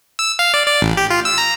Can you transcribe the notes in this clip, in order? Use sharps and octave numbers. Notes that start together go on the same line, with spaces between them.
E6
F5
D5
D5
A1
G4
F4
E6
A#5